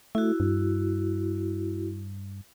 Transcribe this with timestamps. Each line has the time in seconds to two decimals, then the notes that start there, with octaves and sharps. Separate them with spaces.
0.15 A3 E4 F#4
0.40 G2